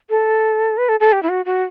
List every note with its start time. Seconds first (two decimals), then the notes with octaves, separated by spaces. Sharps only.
0.10 A4
0.77 B4
0.89 A4
1.00 A4
1.12 G4
1.23 E4
1.29 F#4
1.45 F#4